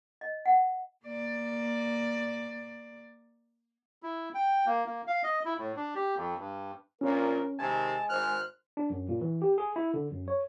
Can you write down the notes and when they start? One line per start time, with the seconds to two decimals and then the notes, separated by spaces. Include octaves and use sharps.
0.21 D#5
0.45 F#5
1.05 A#3 D5
4.03 E4
4.35 G5
4.66 A#3
4.86 A#3
5.07 F5
5.23 D#5
5.45 E4
5.58 A2
5.76 D4
5.95 G4
6.16 F2
6.39 G2
7.01 A#1 A#2 C#4 A#4
7.59 C3 D#3 G#3 G#5 A5
8.09 G#1 C5 F6 F#6
8.77 D4
8.90 F#2
9.09 A#2
9.21 E3
9.42 G4
9.58 G#4
9.76 E4
9.94 D3
10.11 F#2
10.28 C#5